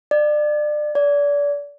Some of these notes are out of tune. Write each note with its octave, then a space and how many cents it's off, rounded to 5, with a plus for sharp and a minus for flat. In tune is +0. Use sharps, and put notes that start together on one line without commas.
D5 +30
D5 -30